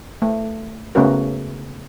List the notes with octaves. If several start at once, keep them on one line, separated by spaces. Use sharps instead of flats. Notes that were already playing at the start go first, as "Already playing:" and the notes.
A3
C#3 A3 B3 C#4 F#4 A#4